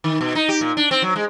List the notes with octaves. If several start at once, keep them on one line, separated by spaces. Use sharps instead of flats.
D#3
B2
D#4
G4
A#2
D4
C4
F#3
G#3